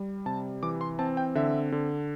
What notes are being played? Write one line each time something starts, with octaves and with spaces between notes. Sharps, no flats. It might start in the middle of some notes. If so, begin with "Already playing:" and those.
Already playing: G3
C3 A5
E3 D6
C6
C4 A5
G5
D3 E5
D3